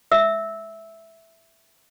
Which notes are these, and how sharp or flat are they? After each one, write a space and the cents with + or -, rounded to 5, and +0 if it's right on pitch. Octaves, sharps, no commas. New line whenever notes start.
E5 +0 E6 -15